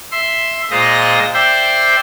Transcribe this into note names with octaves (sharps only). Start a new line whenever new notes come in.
E5 C6
A#2 G#3 F4 C5 D#5 A#6
C5 D5 E5 G5 C6